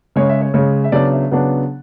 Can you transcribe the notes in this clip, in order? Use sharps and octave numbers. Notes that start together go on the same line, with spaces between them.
C#3 G#3 C#4 C#5
E5
C#5
C#3 G#3 C#4 C#5
E5
C#3 F#3 B3 D4 D5
E5
C#3 F#3 B3 D4 F#5